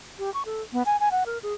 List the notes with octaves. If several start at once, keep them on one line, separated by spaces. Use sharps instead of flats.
G4
C#6
A4
B3
G#5
G#5
F#5
A#4
G#4